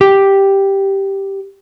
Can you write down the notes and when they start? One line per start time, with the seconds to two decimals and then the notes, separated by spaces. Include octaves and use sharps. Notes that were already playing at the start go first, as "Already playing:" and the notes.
0.01 G4 G5